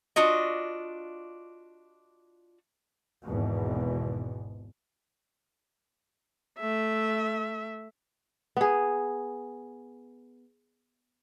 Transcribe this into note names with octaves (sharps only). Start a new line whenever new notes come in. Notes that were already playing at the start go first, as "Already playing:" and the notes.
D4 F4 F#4 D#5
G#1 E2 G#2 B2
A3 E5
B3 G#4